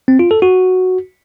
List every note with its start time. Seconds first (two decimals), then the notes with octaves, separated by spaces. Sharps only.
0.08 C4
0.19 F4
0.31 A4
0.42 F#4